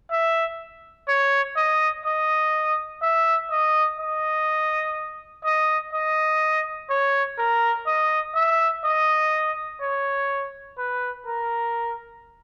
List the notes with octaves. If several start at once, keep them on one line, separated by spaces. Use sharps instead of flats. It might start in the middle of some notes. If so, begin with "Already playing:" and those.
E5
C#5
D#5
D#5
E5
D#5
D#5
D#5
D#5
C#5
A#4
D#5
E5
D#5
C#5
B4
A#4